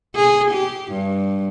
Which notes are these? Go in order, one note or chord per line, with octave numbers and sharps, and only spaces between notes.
G#4
G4
G2